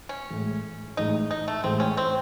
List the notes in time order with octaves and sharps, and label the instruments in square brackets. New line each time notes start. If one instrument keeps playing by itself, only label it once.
[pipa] C#4
[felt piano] A1 A2 G#3
[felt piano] A1 A2 G#3 [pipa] D#4
[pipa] D#4
A3
[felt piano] A1 A2 G#3 [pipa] C4
[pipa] C#4
C4